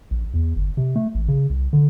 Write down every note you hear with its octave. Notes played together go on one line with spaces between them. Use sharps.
A#1
E2
G1
C3
A3
A1
C#3
C2
D3